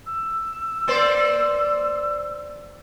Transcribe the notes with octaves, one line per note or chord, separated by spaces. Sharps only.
E6
A#3 C5 D5